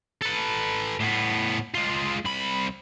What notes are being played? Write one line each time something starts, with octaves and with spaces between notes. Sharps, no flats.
A4 B4
A2 B3
G#3 F4
C2 B5